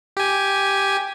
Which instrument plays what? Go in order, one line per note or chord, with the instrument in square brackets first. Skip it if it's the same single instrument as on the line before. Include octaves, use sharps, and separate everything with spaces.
[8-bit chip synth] G4 G#5